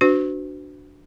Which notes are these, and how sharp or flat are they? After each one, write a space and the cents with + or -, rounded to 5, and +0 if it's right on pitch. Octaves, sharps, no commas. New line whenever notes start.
D4 +0 F#4 +0 B4 +40